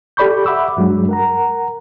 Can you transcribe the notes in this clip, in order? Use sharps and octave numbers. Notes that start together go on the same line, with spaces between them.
G4 A4 D5 B5 C#6 G6
E5 F#5 B5 D6 E6
G2 F#3 G#3 D4
A#4 F#5 A#5